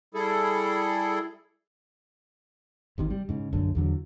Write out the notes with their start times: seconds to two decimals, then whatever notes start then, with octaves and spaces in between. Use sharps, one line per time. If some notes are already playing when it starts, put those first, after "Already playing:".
0.14 G3 E4 G#4 A4
2.98 G#1 C3 D#3
3.10 G3
3.29 G#2 C#3
3.53 A#1 F#2 D3
3.75 E2 D3 F#3